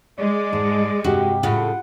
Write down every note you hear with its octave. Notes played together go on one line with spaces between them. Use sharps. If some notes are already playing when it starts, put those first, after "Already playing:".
G#3 D5
G#2 A5
G2 C3 F#4 G4
A2 C#3 F4 F#5